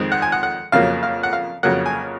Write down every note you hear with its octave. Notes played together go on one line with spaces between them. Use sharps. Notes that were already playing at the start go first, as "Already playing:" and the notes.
Already playing: F2 D#3 G#3 C4
F#5
G#5
F#5
F#5
F2 C#3 F#3 A#3 F5
F5
F#5
F5
F2 C#3 F#3 A#3 F#5
G#5